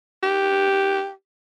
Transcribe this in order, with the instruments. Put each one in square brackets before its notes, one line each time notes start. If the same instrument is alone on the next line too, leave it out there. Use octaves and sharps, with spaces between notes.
[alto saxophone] G4